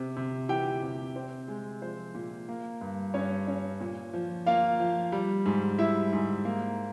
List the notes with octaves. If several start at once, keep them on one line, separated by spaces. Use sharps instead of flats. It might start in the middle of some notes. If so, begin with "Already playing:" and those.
Already playing: C3
C3
E3 G4 G5
C3
C4
G#3
F3 C5
A#2
A#3
G2
G2 C#4 C#5
C#4
A#2
F3
A#3 F4 F5
F3
G3
G#2
G3 E4 E5
G#2
A#3